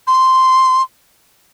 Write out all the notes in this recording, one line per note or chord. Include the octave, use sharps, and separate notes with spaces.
C6